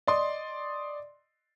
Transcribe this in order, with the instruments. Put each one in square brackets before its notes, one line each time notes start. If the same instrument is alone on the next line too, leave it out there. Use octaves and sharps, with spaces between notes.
[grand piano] D5 D#5 C6 D#6